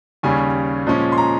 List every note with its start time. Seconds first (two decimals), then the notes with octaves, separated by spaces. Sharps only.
0.23 D#2 C#3 G3 C#4 G#5
0.87 A#2 F3 G#3 C#4
1.12 C6
1.18 A#5